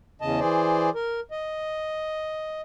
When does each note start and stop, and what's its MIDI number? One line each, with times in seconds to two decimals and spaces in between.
0.21 0.40 40
0.21 0.40 49
0.21 0.40 75
0.21 0.40 81
0.40 0.90 52
0.40 0.90 68
0.40 0.90 72
0.40 0.90 74
0.95 1.20 70
1.31 2.61 75